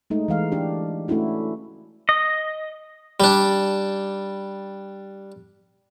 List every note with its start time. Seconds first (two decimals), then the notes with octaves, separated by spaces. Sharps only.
0.10 G#3 A3 D#4
0.28 E3 G#3 F5
0.52 D4 G4
1.08 A3 C#4 D4 E4 F#4
2.09 D#5
3.20 G3 D4